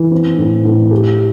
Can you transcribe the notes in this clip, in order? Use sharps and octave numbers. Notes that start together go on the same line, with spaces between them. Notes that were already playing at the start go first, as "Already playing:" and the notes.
Already playing: E3
C4
A2
A2
G4